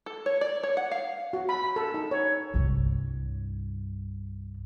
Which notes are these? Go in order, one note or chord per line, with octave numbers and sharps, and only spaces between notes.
A4
C#5
D5
C#5
F#5
F5
F#4
B5
B5
A4
D#4
C#5
C2 G2